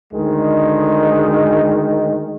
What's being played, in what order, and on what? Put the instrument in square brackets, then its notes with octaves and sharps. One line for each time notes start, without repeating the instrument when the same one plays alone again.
[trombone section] D2 D#3 G#3